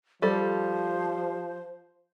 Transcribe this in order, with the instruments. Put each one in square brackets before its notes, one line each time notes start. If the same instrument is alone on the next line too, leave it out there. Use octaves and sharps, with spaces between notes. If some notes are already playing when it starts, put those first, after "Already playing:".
[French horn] F3 [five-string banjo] G3 A4 [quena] C5